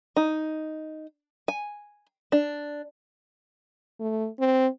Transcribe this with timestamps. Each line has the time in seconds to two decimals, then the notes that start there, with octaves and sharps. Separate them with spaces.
0.17 D#4
1.48 G#5
2.32 D4
4.00 A3
4.39 C4